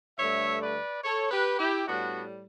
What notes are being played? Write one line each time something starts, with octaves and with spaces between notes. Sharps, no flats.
G2 D3 A3 C#5 E5
B4 D5
A4 C#5
G4 B4
E4 G4
A2 G3 B3 D4 F#4